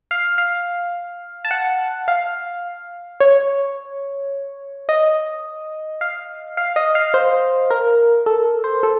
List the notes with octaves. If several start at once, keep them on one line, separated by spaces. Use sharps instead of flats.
F5
F5
A5
F#5
F5
C#5
D#5
F5
F5
D#5
F5
C5
A#4
A4
C5
A4